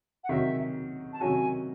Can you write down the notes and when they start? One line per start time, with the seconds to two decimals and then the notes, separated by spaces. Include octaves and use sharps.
0.24 F#5
0.29 C3 D#3 F#3 C#4 F#4 E5
1.13 A5
1.21 C3 D#3 F#3 C#4 F#4 G#5